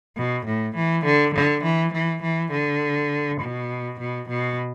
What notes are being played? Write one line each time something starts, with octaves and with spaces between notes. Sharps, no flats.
B2
A2
E3
D3
D3
E3
E3
E3
D3
B2
B2
B2